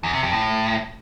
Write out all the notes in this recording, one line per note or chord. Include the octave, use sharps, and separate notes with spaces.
E2
C3
F2
A2